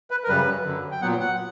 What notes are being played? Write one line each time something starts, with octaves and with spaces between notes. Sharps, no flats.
B4
A#4
F#2 C#3 G3 B4
F#2 D3 F#3
G5
A#2 F#3 B3 F#5
F#5